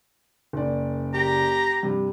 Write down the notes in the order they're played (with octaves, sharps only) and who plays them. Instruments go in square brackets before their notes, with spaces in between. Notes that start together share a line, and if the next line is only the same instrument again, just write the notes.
[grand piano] F#1 D5
[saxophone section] G4 [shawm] A#5
[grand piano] G2 C3